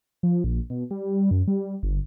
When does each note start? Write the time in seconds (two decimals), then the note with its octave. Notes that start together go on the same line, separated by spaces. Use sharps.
0.23 F3
0.44 A#1
0.70 B2
0.91 G3
1.31 F#2
1.47 G3
1.83 G1